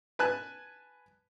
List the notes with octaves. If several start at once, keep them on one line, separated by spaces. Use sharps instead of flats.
B4 G#5 A5 F#6